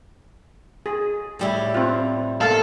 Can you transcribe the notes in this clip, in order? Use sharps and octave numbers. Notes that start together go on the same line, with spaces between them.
G#4
A2 G3 E4
C4 F4
A#3 A4 F5